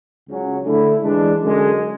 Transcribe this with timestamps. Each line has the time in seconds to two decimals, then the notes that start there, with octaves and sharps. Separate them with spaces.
0.27 C#2 C#3 F#3 C#4
0.64 D3 A3 E4
1.03 E3 G#3 D4
1.40 F#2 D3 G#3